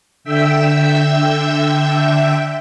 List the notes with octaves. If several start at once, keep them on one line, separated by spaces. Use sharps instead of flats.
D3 E5 G5 E6